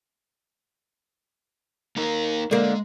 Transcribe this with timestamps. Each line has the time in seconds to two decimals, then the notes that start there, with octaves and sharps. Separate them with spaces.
1.96 A#3 D#4 A#4
2.51 D3 G#3 A#3